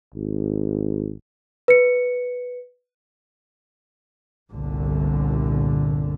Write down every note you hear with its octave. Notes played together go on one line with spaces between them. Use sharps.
G#1
B4 C#7
G1 C2 A#2 D3